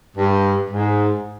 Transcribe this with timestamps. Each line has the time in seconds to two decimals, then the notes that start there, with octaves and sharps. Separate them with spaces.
0.16 G2
0.70 G#2